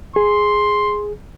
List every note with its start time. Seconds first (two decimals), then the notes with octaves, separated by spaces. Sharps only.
0.16 G#4 C6